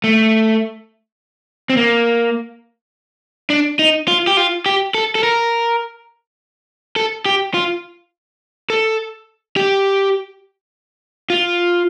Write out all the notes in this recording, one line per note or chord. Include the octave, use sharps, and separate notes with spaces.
A3
C4
A#3
D4
D#4
F4
G4
F4
G4
A4
A4
A#4
A4
G4
F4
A4
G4
F4